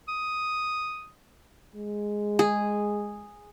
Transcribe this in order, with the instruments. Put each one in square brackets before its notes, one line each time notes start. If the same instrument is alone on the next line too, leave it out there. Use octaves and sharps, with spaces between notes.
[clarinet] D#6
[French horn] G#3
[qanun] G#4